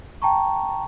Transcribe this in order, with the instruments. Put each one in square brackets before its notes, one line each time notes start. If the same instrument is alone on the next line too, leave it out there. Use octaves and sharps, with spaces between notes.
[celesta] G5 A5 A#5 C#6